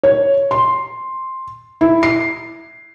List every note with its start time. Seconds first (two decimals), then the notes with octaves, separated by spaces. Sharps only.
0.03 C#5
0.51 C6
1.81 E4
2.03 C7